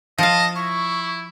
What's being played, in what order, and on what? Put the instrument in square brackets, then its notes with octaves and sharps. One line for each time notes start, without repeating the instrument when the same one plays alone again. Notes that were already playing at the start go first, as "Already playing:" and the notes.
[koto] F3 F5 [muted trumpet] D#5 [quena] A5
[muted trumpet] E4 [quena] C#6